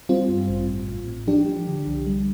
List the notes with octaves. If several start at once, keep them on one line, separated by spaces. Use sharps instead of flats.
G3 C4 F4
G2
A1
A2
A2
A2
F3 D4 G4
F3
D3
C2
G3